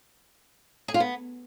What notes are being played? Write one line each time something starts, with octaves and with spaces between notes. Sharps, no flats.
G#4
F4
B3